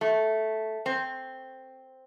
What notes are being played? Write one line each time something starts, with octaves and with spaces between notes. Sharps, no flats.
A3
C4